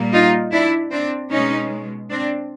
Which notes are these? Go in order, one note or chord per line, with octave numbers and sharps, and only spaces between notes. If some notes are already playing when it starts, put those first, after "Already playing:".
Already playing: A#2 G3 A#3
D#4 F4
D4 E4
C4 D4
B2 G#3 C#4 D#4
C4 D4